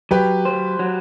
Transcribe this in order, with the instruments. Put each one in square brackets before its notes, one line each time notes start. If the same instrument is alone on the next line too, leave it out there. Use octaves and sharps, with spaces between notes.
[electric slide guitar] F#3 [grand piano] G4 B4
[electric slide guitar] C5
F#3